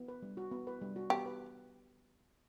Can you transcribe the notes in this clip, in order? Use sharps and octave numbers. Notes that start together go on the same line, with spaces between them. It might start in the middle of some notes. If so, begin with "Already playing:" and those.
Already playing: B3
B4
G3
F#4
B3
B4
G3
F#4
B3 G4
B4